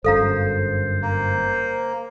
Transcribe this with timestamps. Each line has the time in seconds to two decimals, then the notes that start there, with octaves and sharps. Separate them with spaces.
0.04 G1 F#2 A4 C5 F5 A#5
1.02 A#3